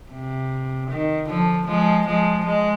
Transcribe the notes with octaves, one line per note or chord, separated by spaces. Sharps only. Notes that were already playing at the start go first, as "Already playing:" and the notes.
C3
D#3
D3 F3
F3 G#3
F3 G#3
G#3